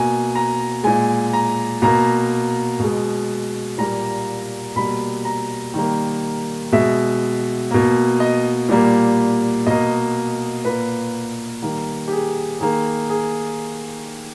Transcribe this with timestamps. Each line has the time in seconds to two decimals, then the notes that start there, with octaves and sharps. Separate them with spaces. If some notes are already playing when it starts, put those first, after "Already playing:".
Already playing: B2 A#3 G#5
0.35 A#5
0.84 A#2 G#3 G#5
1.33 A#5
1.82 B2 A#3 A#5
2.79 B2 G#3
3.78 A#2 G3 A#3 A#5
4.76 B2 G3 A#3 B5
5.25 A#5
5.74 D#3 G3 A#3
6.72 B2 G#3 E5
7.71 B2 A#3
8.20 D#5
8.69 A#2 G3 A#3
9.67 B2 A#3 D#5
10.65 A#2 A#3 B4
11.62 D#3 G3 A#3
12.08 G4
12.12 G#4
12.60 D#3 A#3 G#4
13.10 G#4